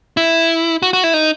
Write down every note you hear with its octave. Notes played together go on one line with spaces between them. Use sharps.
E4
F#4
F#4
E4
D#4